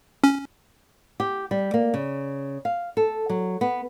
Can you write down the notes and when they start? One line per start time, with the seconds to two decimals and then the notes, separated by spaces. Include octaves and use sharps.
0.24 C#4
1.20 G4
1.51 G3
1.74 A#3
1.94 C#3
2.65 F5
2.97 A4
3.30 F#3
3.61 B3